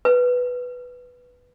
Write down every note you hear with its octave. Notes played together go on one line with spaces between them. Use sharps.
B4